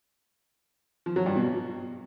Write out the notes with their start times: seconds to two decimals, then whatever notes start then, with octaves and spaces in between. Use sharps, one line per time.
1.06 F3
1.16 F#3
1.26 G2
1.36 B2